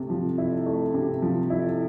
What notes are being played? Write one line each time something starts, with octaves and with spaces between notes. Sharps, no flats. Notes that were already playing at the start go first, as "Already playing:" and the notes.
Already playing: C3 A3
F3
E4
A3
C3
F3
E4